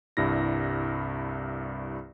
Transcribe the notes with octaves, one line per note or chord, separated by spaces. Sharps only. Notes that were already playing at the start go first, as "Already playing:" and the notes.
C2 G2 E4 A#6